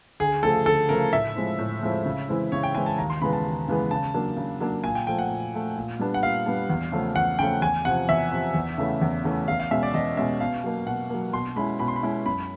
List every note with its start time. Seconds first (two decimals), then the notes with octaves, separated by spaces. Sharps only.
0.20 D2 G#4
0.43 C#3 F3 A3 A4
0.66 D2 A4
0.89 C#3 F3 A3 A#4
1.13 A2 E5
1.35 F3 G#3 C4 E4
1.59 A2
1.83 F3 G#3 C4 E4
2.06 C#3
2.28 E3 G#3 C4 E4
2.52 C#3 C#5
2.63 G5
2.75 E3 G#3 C4 E4 G#5
2.86 A5
2.98 D#2 A#5
3.10 C6
3.21 C#3 E3 G#3 B3 B5
3.33 A5
3.45 D#2
3.68 C#3 E3 G#3 B3
3.91 C#3 A5
4.14 F#3 A#3 D4
4.37 C#3
4.60 F#3 A#3 D4
4.84 A#2 G#5
4.95 G5
5.07 F3 A3 G5
5.19 F#5
5.31 A#2
5.54 F3 A3
5.77 A#2
5.99 G3 B3 D4
6.14 F#5
6.23 A#2 F5
6.46 G3 B3 D4
6.70 E2
6.92 C#3 F3 A3 C#4
7.16 E2 F#5
7.39 C#3 F3 A3 C#4 G5
7.62 E2 G#5
7.85 C3 F3 F#5
8.09 E2 E5
8.32 C3 F3
8.54 E2
8.78 C#3 E3 A3 C#4
9.01 E2
9.24 C#3 E3 A3 C#4
9.48 E2 F5
9.60 F5
9.71 B2 G#3 C#4 E5
9.83 D5
9.93 E2 D#5
10.17 B2 G#3 C#4 E5
10.40 B2 F5
10.64 F#3 A#3
10.86 B2 F#5
11.10 F#3 A#3
11.33 B2 C6
11.56 G#3 C#4 E4 B5
11.79 B2 B5
11.88 C6
11.96 B5
12.03 G#3 C#4 E4
12.26 F#2 B5